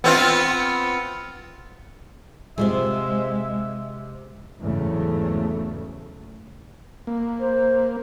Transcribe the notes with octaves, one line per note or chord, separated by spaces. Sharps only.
B3 C4 F4
C3 G#3 F4 G#4 E5
E2 G#2 C#3 F#3 A3
A#3
C5